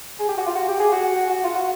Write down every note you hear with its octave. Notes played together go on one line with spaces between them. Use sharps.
G#4
G4
F#4
F4
F#4
G4
G#4
F#4
F#4
F4
F#4